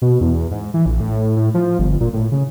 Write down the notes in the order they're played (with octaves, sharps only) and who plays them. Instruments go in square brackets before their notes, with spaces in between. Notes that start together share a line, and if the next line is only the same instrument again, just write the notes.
[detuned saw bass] B2
E2
G#2
E3
A#1
A2
A2
F3
G1
A#2
A2
C#3